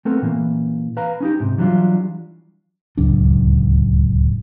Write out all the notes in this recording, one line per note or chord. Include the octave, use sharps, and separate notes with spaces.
A3 B3 C4 A4 A#4
A#2 E3 A#3
B4 F5 A#5
C#4 D#4 G4
G#2 C3
E3 F#3 G3 D4 F4
D1 C#2 F#2 D4